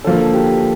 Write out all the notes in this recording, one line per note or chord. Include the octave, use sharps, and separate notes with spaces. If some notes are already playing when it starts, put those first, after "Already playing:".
D3 F3 A#3 A4
G4